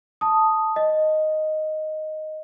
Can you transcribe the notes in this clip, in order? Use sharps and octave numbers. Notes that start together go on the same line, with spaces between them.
A5 D#6
D#5